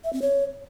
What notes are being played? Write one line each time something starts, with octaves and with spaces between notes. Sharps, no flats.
E5
C4
C#5